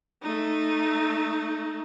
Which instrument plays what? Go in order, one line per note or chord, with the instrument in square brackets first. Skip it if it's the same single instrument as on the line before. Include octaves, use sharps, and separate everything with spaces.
[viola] A3 D#4